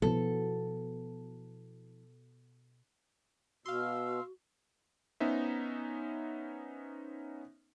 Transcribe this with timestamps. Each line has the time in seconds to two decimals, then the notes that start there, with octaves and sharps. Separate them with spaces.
0.02 B2 F3 B3 E4 A4
3.66 B2 F#4 F5 C6 E6
5.20 B3 C#4 D#4 C5 E5